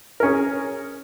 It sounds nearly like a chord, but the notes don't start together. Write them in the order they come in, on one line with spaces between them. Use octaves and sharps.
A#4 C#4 G#4